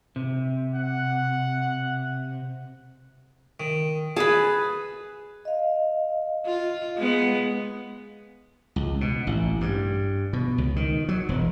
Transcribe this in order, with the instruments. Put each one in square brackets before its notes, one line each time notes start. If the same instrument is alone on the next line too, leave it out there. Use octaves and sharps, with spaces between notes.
[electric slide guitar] C3
[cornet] F#5
[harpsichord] D#3
[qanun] G#4 B4 [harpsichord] A5
[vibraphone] D#5 F5
[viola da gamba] F4
G#3 B3
[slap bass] C#2
B2
A1
G2
B2
C#2
D#3
F#3
E1